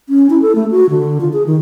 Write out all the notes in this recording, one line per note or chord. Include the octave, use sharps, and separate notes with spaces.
C#4
E4
A4
A3
F#4
D3
F4
G#4
D#3